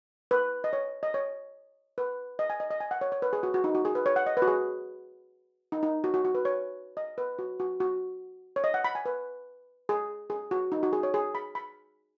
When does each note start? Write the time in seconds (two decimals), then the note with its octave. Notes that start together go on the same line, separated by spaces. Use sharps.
0.31 B4
0.64 D#5
0.73 C#5
1.03 D#5
1.14 C#5
1.98 B4
2.39 D#5
2.50 G#5
2.60 D#5
2.71 D#5
2.80 G#5
2.91 F#5
3.01 C#5
3.12 C#5
3.22 B4
3.33 G#4
3.43 F#4
3.54 F#4
3.64 D#4
3.75 F#4
3.85 G#4
3.95 B4
4.06 C#5
4.16 F#5
4.26 D#5
4.37 B4
4.42 F#4
4.48 G#4
5.72 D#4
5.83 D#4
6.04 F#4
6.14 F#4
6.25 F#4
6.35 B4
6.45 C#5
6.97 D#5
7.18 B4
7.39 F#4
7.60 F#4
7.80 F#4
8.56 C#5
8.64 D#5
8.74 F#5
8.84 B5
8.95 G#5
9.06 B4
9.89 G#4
10.30 G#4
10.51 F#4
10.72 D#4
10.83 F#4
10.93 G#4
11.03 C#5
11.14 G#4
11.35 B5
11.55 B5